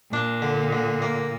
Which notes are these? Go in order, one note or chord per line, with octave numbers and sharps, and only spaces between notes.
A#2 D4
D3
D3
A#3